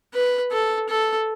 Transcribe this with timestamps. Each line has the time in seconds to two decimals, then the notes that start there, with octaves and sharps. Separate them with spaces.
0.14 B4
0.52 A4
0.89 A4